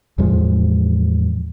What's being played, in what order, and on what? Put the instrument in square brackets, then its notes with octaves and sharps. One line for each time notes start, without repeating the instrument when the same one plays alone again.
[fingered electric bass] E2 A2 F3 G#3